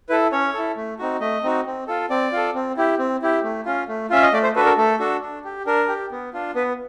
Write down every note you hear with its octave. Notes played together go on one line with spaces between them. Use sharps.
E4 A4 B4
C#4 C#5
E4 A4
A3
C4 D#4 F#4
A3 D#5
C4 D#4 F#4
C4
F4 A4
C4 D5
F4 A4
C4
E4 G4
C4
E4 G4
A3
C#4 F4
A3
C#4 F4 E5
D#5
A3 D5
C5
D4 F#4 A4 B4
A#4
A3 A4
D4 F#4 A4
D4
G4
D4 A#4
G4
B3
D4 F4
B3 B4